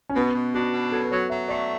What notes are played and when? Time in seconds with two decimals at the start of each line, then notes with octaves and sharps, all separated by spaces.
0.09 C#4
0.15 B2 B3
0.34 B2
0.54 D4 F#4
0.72 B2
0.92 F#3 A4
1.04 B4
1.11 F#3 C#5
1.30 F#3 E5
1.48 A3 D5